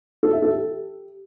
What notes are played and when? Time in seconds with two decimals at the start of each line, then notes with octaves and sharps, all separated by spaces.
0.23 A4
0.33 E5
0.42 A4
0.52 G4